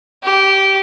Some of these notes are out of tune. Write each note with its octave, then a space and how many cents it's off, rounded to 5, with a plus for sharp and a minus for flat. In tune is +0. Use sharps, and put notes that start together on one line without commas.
G4 -15